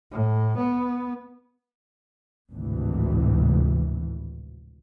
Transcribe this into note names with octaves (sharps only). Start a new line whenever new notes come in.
A2
B3
G#1 D2 A2 C3 E3